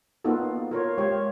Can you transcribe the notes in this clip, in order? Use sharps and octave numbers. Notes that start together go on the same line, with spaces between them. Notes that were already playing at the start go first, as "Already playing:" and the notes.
A#3 B3 D#4 F4 F#4 A4
F4 A#4 C#5
G#3 G4 C5 C#5 F5